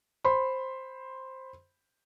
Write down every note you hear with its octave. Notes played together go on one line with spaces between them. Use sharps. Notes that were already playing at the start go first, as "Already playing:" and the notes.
C5 B5 C6